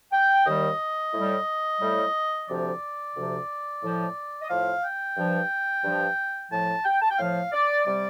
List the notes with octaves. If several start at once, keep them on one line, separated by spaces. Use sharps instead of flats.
G5
D#2 D#3 G3 D#5
A2 G3
A2 G3
D2 C3 F3 D5
D2 C3 F3
A2 F3
D#5
A2 F3 F5
G5
G2 F3
G2 F3
A2 F3 A5
G5
A5
G5
A2 F3 F5
D5
C3 G3 D5